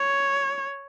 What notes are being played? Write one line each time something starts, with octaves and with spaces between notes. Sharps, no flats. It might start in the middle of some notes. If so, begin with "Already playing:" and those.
Already playing: C#5